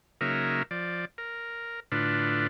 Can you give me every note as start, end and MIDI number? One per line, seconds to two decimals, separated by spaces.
0.21 0.63 49
0.21 0.63 54
0.21 0.63 58
0.21 0.63 63
0.21 0.63 70
0.21 0.63 76
0.71 1.05 53
0.71 1.05 74
1.18 1.80 70
1.92 2.47 45
1.92 2.47 50
1.92 2.47 62
1.92 2.47 65
1.92 2.47 71